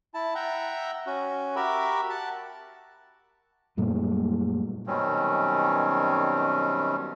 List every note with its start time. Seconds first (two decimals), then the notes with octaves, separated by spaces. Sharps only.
0.14 E4 A5
0.35 E5 F#5 G5 A#5
1.07 C#4 F#4
1.56 F#4 G4 A#4 E5 B5
2.10 F#5 A5
3.77 F#2 A#2 G3 A3
4.87 F#2 B2 D#3 G3 C4 C#4